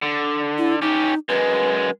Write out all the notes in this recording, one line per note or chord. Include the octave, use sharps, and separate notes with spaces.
D3
E4
C#4 D#4 G4
F#2 G#3 B4